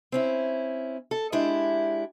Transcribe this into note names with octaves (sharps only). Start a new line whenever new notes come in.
C4 C#4 E4
A4
G#3 D4 E4 G4